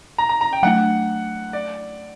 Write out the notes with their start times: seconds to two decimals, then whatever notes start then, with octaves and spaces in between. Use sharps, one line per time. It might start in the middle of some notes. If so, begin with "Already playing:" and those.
0.18 A#5
0.29 A#5
0.41 A#5
0.53 G5
0.63 F#3 A3 D4 F#5
1.53 D5